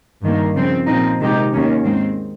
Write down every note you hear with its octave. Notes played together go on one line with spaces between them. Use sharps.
G2 D#3 A#3
C#3 F3 C4
A#2 F3 C4 D#4
C3 D#3 G#3 D#4 G4
D#2 D#3 A#3 C#4
G#2 D#3 G#3 C4